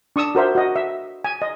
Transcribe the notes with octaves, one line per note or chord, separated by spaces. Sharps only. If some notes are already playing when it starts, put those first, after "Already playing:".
D4 C#6 D#6 E6
F#4 A#4 C5 E5
F#4 D#5
E5
G#5
D#5